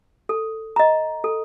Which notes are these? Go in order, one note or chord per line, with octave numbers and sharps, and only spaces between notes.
A4
D#5 A#5
A4